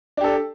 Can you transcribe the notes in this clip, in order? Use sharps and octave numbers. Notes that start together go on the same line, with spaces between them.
D4 G4 A4